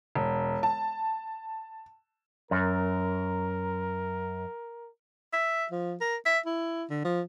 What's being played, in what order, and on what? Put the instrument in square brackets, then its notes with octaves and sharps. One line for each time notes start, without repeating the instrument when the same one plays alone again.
[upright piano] E1
A5
[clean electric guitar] F#2 [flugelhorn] A#4
[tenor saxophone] E5
F3
A#4
E5
E4
D3
F3